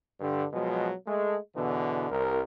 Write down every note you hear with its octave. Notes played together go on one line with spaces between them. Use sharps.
G2 D3
B2 F3 F#3 G#3
G#3 A3
E2 B2 D3 E3
C2 A#4